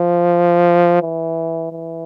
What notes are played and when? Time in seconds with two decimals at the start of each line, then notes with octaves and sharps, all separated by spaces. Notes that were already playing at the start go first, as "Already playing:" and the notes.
Already playing: F3
1.02 E3
1.72 E3